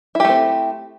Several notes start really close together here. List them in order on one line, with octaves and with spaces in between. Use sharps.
E4 G4 A3 C4